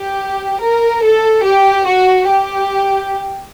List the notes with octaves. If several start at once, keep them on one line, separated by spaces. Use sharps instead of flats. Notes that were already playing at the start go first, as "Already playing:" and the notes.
Already playing: G4
A#4
A4
G4
F#4
G4